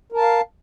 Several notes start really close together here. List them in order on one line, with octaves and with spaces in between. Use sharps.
A#4 A5 F5